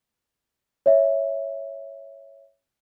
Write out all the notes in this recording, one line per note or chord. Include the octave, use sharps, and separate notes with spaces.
C#5 E5